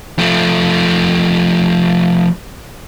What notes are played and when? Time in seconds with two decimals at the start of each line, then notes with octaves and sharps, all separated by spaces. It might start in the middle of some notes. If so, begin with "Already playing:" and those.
0.19 F3 A3